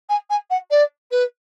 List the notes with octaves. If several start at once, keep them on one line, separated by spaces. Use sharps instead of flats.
G#5
G#5
F#5
D5
B4